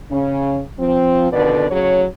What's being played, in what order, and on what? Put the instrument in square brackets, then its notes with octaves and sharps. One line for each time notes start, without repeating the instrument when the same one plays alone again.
[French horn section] C#3 C#4
F3 C4
F2 B2 D3 D#3 B4 D5
A2 C#3 F#3 G#4 C#5